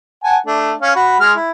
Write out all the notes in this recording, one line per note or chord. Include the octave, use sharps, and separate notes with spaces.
F#5 G#5 A5
A3 D4
C#4 F5
F#4 B5
G#3 F6
E4